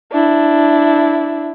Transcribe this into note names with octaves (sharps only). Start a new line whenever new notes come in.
D4 E4